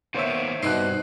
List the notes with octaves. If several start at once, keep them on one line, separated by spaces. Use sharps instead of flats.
D#3 A#3 B3 C5 C#5 E5
G2 B2 G3 C4 D#4 F#6 C7